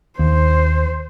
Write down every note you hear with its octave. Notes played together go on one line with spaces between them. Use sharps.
D#2 C5